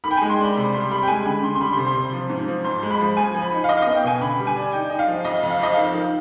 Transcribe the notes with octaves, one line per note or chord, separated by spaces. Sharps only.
D#3 B5
G5
G#3 G#5
C6
D4 B5
C3 B5
G3 C6
G3 B5
G5
G#3 G#5
D3 B5
D3 C6
C6
G3 B5
C3 C6
C6
C3
F3
G#2
F3
F2 C6
G#3
B5
F3
F3 G#5
F3
B5
D#4
F5
D#4 D#5
F5
B3 D#5
G5
B2 G#5
D3 B5
G3
G#5
D4
D#4 G5
D#4
F5
F3
F2 D#5
F2
F5
F3 D#5
D#3 F5
D#3